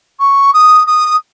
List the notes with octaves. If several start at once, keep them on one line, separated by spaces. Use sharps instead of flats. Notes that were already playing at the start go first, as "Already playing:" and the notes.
C#6
D#6
D#6